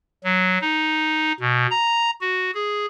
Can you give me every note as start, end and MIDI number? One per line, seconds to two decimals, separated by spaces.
0.24 0.58 54
0.61 1.32 63
1.40 1.66 47
1.71 2.11 82
2.21 2.51 66
2.54 2.86 68